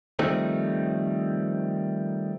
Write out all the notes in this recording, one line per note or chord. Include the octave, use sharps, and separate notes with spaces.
D#3 F3 G3 A3 C4 D#4